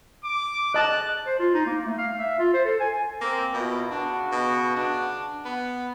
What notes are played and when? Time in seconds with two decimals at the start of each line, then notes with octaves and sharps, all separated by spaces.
0.24 D6
0.74 D#5 A5 F#6
1.26 C5
1.39 F4
1.54 D#4
1.66 A#3
1.85 A3
1.98 F5
2.19 E5
2.39 F4
2.54 C5
2.65 A4
2.80 G#5
3.21 A#3 C4
3.53 B2 E4 F4 A#4
3.91 C#3 D4 F#4
4.32 B2
4.76 D4
5.45 B3